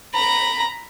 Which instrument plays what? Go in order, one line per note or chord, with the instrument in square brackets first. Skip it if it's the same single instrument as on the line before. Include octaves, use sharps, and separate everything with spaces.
[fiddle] A#5 B5